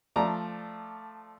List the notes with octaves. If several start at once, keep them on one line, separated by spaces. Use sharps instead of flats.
F3 A3 D5 A#5